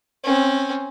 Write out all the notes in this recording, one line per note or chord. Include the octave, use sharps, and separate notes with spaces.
C4 C#4